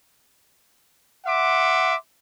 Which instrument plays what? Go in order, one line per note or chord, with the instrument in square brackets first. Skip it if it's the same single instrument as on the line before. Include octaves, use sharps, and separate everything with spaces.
[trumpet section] E5 F#5 C6 D6